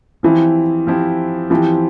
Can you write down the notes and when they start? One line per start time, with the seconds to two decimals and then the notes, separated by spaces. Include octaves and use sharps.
0.23 E3 F3 C4 E4 G4
0.87 F3 C4 E4 G4
1.50 E3 F3 C4 E4 G4